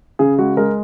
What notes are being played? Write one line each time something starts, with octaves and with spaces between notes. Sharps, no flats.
C#3 G#4
G#3 F#4
G#3 A#4